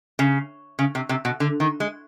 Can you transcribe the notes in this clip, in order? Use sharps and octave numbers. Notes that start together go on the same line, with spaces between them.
C#3
C#3
C3
C3
B2
D3
D#3
G#3